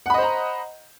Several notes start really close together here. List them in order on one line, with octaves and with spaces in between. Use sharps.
F#5 B5 D#5 C5 A#5